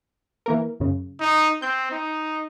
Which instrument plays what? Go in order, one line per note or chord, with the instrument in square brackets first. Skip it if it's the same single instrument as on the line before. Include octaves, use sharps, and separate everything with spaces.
[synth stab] E3 A#3 A#4
F#2 C#3
[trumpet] D#4
[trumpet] C4 [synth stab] G6
[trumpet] D#4